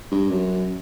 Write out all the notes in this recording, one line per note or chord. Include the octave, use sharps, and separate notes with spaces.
G2
F#2